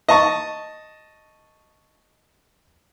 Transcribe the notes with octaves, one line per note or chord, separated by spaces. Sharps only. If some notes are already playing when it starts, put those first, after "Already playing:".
D#5 A5 C#6